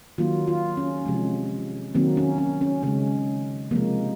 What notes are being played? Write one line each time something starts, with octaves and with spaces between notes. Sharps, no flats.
D#3 F#3 A#3 F4
F4
C#4
C3 F3 G#3
D#3 F#3 A#3 C4
C#4
C#4
C#4
C#3 G#3 C#4
C3 F3 G#3 A#3